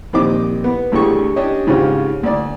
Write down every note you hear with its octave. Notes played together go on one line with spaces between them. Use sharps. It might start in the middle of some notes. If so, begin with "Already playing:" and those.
A#1 D#3 C4 G4 D#5 D6
B3
A1 D2 D3 G4 G#4 C#6
C#4 D4 G4 C#5 D#5
G#2 C#3 C4 C#4 F4 G4
D2 D5